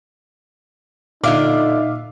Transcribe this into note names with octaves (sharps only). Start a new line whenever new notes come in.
A#2 D3 D#4 F4 D5 E5 F5 D6